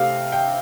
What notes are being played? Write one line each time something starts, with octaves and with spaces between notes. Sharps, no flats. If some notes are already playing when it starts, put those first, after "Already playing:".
Already playing: C3 A3 C4 F5
G5